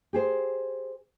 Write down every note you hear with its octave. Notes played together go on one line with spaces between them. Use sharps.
G4 G#4 C5